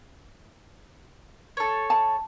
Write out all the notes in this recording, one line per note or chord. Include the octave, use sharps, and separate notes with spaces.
A4 C#5
A5